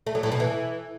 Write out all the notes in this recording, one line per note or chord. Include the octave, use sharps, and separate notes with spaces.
A3
F#3
A2
B2
E3